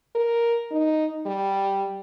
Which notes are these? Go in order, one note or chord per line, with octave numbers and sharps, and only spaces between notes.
A#4
D#4
G3